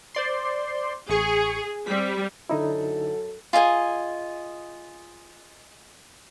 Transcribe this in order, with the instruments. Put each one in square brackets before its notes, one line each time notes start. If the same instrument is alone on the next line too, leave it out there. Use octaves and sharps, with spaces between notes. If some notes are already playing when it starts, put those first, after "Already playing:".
[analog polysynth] C5 D5 C6
[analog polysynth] A1 C#6 C7 [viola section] G#4
[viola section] G3 [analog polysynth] C4 B6
[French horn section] F#2 A4 [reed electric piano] D3 D#4 E4
[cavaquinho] F4 G#4 D#5 G#5